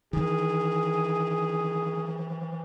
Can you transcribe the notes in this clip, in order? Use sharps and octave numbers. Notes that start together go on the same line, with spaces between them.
D#3 E3 G#4